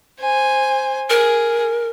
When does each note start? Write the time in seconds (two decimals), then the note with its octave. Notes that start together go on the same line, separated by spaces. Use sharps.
0.19 C5 G#5
1.10 G#4 A#4